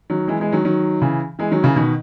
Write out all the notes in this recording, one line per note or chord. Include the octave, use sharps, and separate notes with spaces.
D#3 F#3
E3 G#3
E3 G#3
D#3 F#3
D#3 F#3
C#3 E3
E3 G#3
D#3 F#3
C#3 E3
B2 D#3